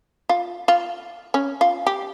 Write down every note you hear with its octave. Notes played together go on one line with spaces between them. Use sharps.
F4
F4
C#4
F4
G4